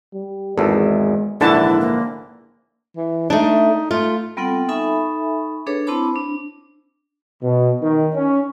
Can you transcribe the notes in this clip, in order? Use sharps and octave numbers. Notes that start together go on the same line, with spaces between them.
G3
G#1 E2 G#3 A4
A#1 G#2 D3 E3 D4 E4 A4 A5
A#3
E3
A3 D4 D#4
A3 F4
G3 B3 C4 F4 A4 F#5
D#4 A4 E5 G#5 B5 C#6
D4 G#4 A4 B4 C#5
C4 E4 C5 A5 B5 D6
D4
B2
D#3
C#4